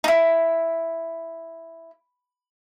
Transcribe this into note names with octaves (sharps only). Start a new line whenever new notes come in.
D#4 E4